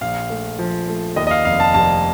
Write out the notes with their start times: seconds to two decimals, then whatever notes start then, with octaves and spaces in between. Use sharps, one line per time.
0.01 A#1 F5
0.30 A3
0.59 F3
0.88 A3
1.16 D#2 D#5
1.27 D#5
1.31 F5
1.45 F1 F5
1.60 A5
1.74 F1 A5